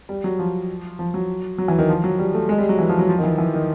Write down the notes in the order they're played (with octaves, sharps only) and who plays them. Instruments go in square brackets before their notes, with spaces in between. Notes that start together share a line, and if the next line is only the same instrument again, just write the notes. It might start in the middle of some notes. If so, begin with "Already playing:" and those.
[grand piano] G3
F#3
F3
F3
F#3
F#3
E3
D#3
F3
F#3
G3
A3
G#3
G3
F#3
E3
F3
F#3
F3
D#3
E3
E3
D#3